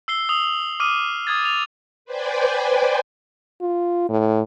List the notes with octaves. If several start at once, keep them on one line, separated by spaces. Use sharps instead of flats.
E6 C7 G7
D#6 F7 F#7
D6 D#6 F6 D#7
D#6 G#6 A6
F7
B4 C5 D5 G5 G#5
F4
A2